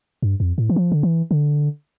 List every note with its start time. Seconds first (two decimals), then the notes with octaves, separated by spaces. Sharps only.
0.22 G2
0.40 F2
0.58 A2
0.70 E3
0.76 F3
0.92 D3
1.03 E3
1.31 D3